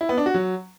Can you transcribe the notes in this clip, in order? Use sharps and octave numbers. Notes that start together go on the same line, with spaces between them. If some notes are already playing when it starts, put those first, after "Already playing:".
E4
B3
D4
F#4
F#3